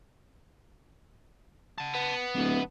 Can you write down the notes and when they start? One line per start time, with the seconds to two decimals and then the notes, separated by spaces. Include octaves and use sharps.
1.78 F#5 A5
1.95 B3
2.36 D1 D4 E4